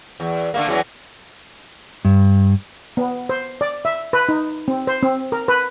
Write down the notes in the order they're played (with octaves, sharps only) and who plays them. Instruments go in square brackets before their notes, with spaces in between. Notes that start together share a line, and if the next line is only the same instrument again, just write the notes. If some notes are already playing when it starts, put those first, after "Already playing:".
[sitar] E2
D3 A3 A#3
E2 E3 F#3
[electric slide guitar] G2
[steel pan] B3
C5
D5
E5
B4
D#4
C4
C5
C4
A#4
B4